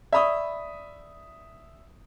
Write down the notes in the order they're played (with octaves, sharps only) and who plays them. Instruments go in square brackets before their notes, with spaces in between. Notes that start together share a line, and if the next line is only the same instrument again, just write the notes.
[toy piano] D5 B5 C#6 [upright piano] E5 D#6